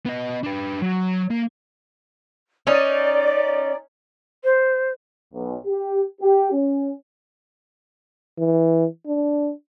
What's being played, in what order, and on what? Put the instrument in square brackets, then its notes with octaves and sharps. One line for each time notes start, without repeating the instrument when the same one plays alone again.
[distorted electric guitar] B3 D#5
D4 B4
F#3
A#3
[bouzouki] C#4 D#4 [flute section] D5
[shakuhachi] C5
[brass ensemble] B1
G4
G4
C#4
[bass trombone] E3
D4